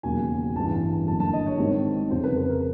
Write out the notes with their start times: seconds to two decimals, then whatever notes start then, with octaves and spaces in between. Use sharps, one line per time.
0.03 E1 D#2 C#3 F#3 G#5
0.55 A1 G2 E3 A5
1.07 F#1 F#2 D3 A5
1.20 A5
1.33 D#5
1.46 C#5
1.59 G#2 D#3 G3 C4
2.10 F1 F2 C#3 C5
2.24 B4
2.36 B4
2.49 A#4